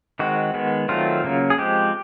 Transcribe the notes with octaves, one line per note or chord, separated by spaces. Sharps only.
D#3 G#3 C4 F#4
D#3 G#3 B3
D#3 F#3 A3 C4 F4
C#3 F#3 A#3
G#4
F3 G#3 C4 G4